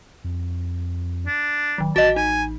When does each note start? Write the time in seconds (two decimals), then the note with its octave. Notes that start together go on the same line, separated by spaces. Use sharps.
0.24 F2
1.27 D4
1.78 D1 D#3 F#3
1.96 A1 F#4 D#5 A5
2.16 D#4 G#5